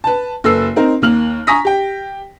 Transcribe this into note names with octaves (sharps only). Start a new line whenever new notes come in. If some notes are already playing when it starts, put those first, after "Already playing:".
B4 A5
F#1 A4 B4 E6 C7
C4 D#4 A#4
D#2 A#3 F6 F#7
G#5 A#5 C#6 D#6 A#6 B6
G4 G5